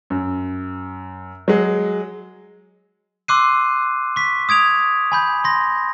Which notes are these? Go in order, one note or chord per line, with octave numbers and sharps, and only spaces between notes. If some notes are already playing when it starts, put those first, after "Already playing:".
F#2
F#3 G#3
C6 D6 E6 F#6 C7 D#7
C#6 B6
D#6 G#6 D7 F7
G#5 B5 G6
C6 A#6